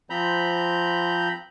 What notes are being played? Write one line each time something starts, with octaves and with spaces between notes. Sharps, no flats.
F3 C4 A#5 B5 G6